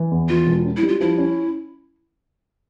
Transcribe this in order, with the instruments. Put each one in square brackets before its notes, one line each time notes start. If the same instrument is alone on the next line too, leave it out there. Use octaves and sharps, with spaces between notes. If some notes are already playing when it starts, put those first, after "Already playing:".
Already playing: [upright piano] E3
E2
[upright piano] E3 [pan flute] F4
[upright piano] E1
C#4
[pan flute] E4
[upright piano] G3
[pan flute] F4
[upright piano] F3 [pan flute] E4
[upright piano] C#4